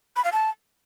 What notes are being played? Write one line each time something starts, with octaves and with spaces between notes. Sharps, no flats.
B5
F5
A5